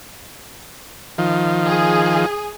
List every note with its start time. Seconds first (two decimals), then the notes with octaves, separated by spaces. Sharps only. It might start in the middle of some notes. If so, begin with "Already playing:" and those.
1.18 D#3 F3
1.66 G#4